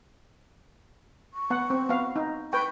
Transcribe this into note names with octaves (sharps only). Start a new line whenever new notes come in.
C#6
B3 F#5
C4
B3 F5
D#4
B4 G5 C#6